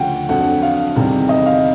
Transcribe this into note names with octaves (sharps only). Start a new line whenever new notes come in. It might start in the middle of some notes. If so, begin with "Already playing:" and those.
Already playing: D2 C#3 F3 F#5 G5
F2 D3 F#3 F#5
F5
E2 C3 D#3 G3
D#5
F5